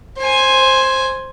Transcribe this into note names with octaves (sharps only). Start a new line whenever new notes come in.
C5 G#5